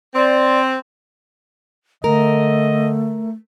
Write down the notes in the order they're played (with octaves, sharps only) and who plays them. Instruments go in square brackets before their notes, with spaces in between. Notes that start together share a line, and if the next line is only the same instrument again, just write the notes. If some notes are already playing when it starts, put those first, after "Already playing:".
[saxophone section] C4 [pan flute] D5
[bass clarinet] D3 [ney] A3 [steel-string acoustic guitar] A#4 [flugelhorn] D#5